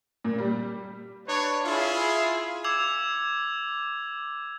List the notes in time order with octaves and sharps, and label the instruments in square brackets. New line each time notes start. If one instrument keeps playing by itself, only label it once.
[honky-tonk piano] A#2
G3
[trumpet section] D4 B4 C#5
E4 F4 G#4
[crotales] D6 E6 G#6 F7